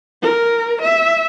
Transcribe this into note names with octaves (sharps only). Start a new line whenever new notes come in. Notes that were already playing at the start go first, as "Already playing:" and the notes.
A#4
E5